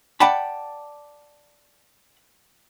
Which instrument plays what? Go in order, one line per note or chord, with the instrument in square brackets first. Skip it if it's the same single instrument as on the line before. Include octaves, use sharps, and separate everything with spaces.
[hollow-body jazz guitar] D5 F#5 G5 A5 B5